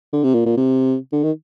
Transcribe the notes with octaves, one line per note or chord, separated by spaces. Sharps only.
D3
C3
A#2
A#2
C3
D3
D#3